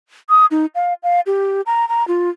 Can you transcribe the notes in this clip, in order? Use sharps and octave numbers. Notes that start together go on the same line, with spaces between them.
D#6
D#4
F5
F5
G4
A#5
A#5
F4